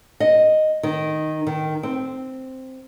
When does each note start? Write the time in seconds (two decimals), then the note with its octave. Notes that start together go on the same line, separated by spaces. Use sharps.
0.20 D#5
0.83 D#3
1.47 D#3
1.83 C4